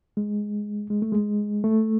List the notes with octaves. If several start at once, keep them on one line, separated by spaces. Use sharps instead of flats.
G#3
G#3
A3
G#3
A3